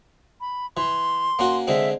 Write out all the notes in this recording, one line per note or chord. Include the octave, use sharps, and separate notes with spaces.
B5
E3 C6
A#3 C#4 F#4
D3 G#3 C4 E5